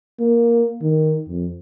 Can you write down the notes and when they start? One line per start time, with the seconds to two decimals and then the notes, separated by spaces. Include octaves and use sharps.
0.20 A#3
0.82 D#3
1.29 F2